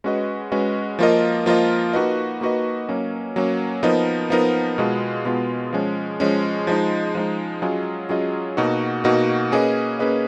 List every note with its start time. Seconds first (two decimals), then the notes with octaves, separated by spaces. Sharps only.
0.04 G#3 C#4 F#4 B4 D#5
0.52 G#3 C#4 F#4 B4 D#5
0.99 F3 A#3 F4 A#4 D#5
1.46 F3 A#3 F4 A#4 D#5
1.93 A#3 D#4 F#4 B4 D#5
2.41 A#3 D#4 F#4 B4 D#5
2.89 F#3 A#3 C#4
3.36 F#3 A#3 C#4
3.83 F3 B3 D#4 A#4 D#5
4.30 F3 B3 D#4 A#4 D#5
4.78 B2 G#3 B3 F4
5.25 B2 G#3 B3 F4
5.73 F3 G#3 C#4
6.20 F3 G#3 C#4
6.67 F3 G#3 D#4
7.15 F3 G#3 D#4
7.62 F#3 C#4 F4 G#4 D#5
8.09 F#3 C#4 F4 G#4 D#5
8.57 B2 A#3 D#4 F#4
9.04 B2 A#3 D#4 F#4
9.52 A#3 C#4 G#4 B4 D#5
9.99 A#3 C#4 G#4 B4 D#5